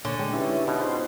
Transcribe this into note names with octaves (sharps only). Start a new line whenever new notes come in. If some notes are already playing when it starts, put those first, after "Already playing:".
A#2 D3 C#5 G#5
G#3 G5
C#4 D#4 E4 G4 B4
B2
D#4 F4 G#4 C5